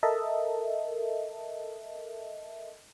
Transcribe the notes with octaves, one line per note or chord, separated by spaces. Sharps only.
A4 A#4 D#5 E5 A5